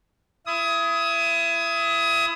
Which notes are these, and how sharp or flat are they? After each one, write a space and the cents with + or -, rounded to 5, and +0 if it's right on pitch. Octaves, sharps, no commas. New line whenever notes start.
E4 +30 D#6 +25